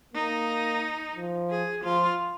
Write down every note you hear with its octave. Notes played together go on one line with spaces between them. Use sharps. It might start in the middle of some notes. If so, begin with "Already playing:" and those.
A#3 D#4
F3
G#4
F3 F4